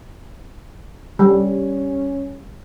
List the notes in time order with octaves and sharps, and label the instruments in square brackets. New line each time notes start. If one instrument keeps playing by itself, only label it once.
[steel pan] G3 [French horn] C#4